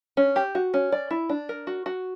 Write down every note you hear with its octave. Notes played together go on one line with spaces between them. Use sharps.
C#4
G4
F#4
C#4
D5
E4
D4
A#4
F#4
F#4